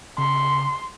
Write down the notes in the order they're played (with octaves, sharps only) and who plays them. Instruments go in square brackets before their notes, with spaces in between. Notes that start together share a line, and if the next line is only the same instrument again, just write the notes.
[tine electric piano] C#3 [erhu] C6